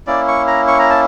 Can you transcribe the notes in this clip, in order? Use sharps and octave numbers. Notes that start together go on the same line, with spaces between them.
A#3 C#4 E4 D5
C#6
A#5
C#6
A#5
A5